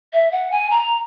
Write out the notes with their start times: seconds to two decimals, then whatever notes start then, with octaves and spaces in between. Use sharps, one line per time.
0.13 E5
0.32 F#5
0.52 G#5
0.71 A#5